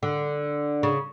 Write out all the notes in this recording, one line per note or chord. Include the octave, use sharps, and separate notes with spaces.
D3
C#3